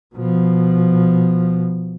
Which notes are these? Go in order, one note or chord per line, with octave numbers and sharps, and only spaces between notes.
B2 F3